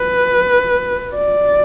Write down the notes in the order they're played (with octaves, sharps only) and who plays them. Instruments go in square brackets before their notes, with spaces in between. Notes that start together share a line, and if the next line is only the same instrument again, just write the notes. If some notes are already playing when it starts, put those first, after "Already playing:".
Already playing: [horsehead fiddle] B4
D5